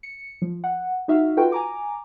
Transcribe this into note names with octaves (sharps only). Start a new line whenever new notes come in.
C#7
F3
F#5
D#4 F#4 E5 F5
F4 F#4 A4 B4 G5
G#5 A#5 D6